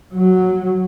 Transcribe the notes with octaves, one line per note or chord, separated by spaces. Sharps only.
F#3